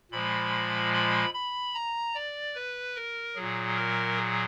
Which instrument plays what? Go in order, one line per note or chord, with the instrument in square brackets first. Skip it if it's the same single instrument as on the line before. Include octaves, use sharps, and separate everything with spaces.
[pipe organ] A#2 F3 G#3 B5
B5
B5
A#5
D5
B4
A#4
A#2 F#3 G#4
A#4
G#4